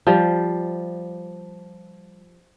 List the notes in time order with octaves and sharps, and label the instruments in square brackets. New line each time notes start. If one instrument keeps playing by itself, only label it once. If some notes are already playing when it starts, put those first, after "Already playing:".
[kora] F3 G3